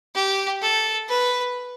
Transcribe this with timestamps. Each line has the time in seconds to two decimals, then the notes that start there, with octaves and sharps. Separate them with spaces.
0.15 G4
0.62 A4
1.09 B4